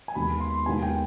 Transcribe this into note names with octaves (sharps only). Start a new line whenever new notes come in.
G#5
D#2 D#3 G#3 B3 B5
C6
D#2 D#3 G#3 B3 G#5
G5